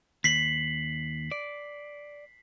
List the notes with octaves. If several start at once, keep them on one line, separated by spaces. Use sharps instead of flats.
D#2 B6 C7 F#7
D5